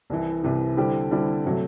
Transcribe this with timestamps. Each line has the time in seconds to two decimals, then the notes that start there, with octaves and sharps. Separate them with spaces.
0.10 C2 C3 E3
0.43 C2 C3 E3
0.77 D3 G3 C4 E4 G4
1.11 D3 G3 C4 E4 G4
1.46 C3 F#3 A3